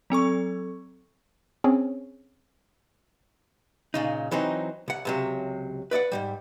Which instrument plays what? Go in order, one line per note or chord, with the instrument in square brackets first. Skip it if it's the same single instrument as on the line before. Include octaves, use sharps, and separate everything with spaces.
[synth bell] F#3 C4 A4 C#6
[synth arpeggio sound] C4 C#4 G#4 C#5
[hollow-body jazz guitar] A#2 C#3 D#4
E3 F#3 C4 D#4
C2 F#5
C#2 C3 F#3
B4 D5 D#5 F#5
G#2 C#3 G3